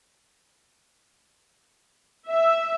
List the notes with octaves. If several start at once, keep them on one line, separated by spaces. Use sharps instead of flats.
E5